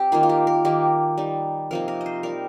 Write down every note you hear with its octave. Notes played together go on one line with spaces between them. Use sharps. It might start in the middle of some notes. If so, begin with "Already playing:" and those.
Already playing: C4 G4 G5
D#3 A#3 D#4 F4
F4
G4
A#4
D#3 A#3 D#4 G4
G3 D#4
C3 F3 A#3 D#4 A#4
A#4
D#5
C5
G3 D#4 A#4